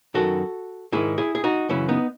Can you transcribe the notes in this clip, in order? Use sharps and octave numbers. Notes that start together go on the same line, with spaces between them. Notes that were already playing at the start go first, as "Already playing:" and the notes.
F#2 D#3 F#4 A4
G#2 D#3 E4 G#4
E4 G#4
G#4
D#4 F#4
F#2 C#3 E3 C#4 E4
B3 D#4